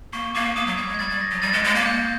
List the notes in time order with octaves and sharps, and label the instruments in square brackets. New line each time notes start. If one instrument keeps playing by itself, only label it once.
[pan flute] A#3 [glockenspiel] C#6
[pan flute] A#3 [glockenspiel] D6
[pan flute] A#3 [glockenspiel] D#6
[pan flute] F#3
[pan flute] G3 [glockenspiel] G#6
[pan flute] G#3
[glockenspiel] G#6
[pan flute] G3 [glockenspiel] A6
[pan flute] G3
[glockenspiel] A#6
[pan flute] F#3
[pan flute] G3 [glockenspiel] A6
[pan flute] G#3
[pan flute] G#3 [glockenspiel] G#6
[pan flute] A#3
[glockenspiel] G6